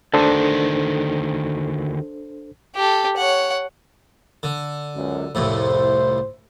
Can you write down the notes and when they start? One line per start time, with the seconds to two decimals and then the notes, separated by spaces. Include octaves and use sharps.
0.14 D2 D#3 D4 A4 C5
2.76 G4 A4
3.17 C#5 F#5
4.43 D3
4.95 C#2 F#2
5.35 C2 F2 A2 C5